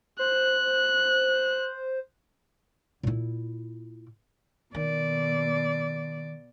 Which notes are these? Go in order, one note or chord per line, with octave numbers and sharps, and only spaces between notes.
C5 F#6
A#2 E4
B2 D#3 D5